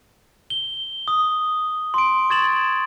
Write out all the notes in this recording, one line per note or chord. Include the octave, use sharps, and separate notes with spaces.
G7
D#6
C6 D7
C#6 G#6 A6 E7 F#7